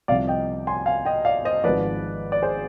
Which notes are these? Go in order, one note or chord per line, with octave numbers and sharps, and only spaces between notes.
C2 C3 F3 D5 F5
D#5 G5
G#5 C6
F5 G#5
D#5 G5
D5 F5
C5 D#5
G#1 G#2 F3 B4 D5
D5
G#4 C5